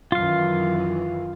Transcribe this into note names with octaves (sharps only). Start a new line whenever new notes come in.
F#2 D#3 E3 F4 F5